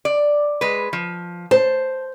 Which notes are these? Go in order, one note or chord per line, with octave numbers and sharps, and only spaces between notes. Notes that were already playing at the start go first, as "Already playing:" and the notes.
D5
G#3 B4
F3
C5 A5